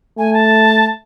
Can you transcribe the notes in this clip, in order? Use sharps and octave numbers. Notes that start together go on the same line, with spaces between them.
A3 G#5
A5